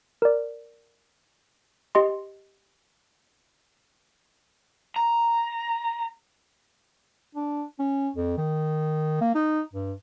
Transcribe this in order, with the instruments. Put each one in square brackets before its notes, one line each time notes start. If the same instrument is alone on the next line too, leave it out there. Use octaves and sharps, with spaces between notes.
[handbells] A#4 D5
G4 D#5 C6
[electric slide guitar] A#5
[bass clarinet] D4
C#4
F2
D#3
A#3
D#4
G2